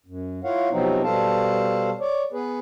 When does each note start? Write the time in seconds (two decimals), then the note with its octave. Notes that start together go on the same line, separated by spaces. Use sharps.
0.06 F#2
0.44 E4 F4 C#5 F5 F#5
0.71 C3 F3 F#3 B3 C4 D#4
1.04 B2 G3 A4 C5 F5 A5
2.00 C#5 D5
2.33 B3 G#4 B4